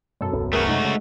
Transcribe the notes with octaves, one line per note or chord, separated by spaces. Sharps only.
F#2 B2 A4
D#1 C2 B3
A3 F#4 G#4 A#4 B4
C3 G#3 D#4
C#3